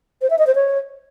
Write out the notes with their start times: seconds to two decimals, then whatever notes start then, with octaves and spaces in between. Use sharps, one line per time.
0.22 C5
0.30 E5
0.39 D#5
0.47 C5
0.55 C#5